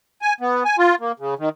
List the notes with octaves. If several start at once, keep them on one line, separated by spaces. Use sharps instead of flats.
G#5
B3
G#5
F4
A#3
C#3
D#3